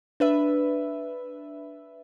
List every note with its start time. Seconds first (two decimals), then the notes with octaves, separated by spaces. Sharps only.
0.20 D4 B4 E5